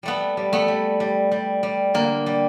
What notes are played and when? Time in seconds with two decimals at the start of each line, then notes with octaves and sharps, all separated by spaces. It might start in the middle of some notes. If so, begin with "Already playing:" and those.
0.03 G3 A3 B3
0.37 G3
0.53 A3 B3
0.68 G3
1.00 G3
1.31 G3
1.63 G3
1.94 D3 A#3
2.26 G3